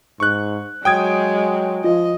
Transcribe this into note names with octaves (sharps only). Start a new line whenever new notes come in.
G#2 C#6 F#6
F#3 G#3 G5 D#6 G#6
F3 F4 D#5